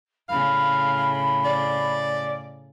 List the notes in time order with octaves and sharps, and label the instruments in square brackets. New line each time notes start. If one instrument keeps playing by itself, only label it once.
[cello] A2 C#3 [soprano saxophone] F5 [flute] B5
[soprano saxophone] D5